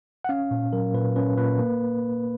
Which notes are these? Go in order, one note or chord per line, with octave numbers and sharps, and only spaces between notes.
F#5
C#4 F5
A#2
F#3 A#4
A#2 B4
C#4 B4
A#2 B4
A#3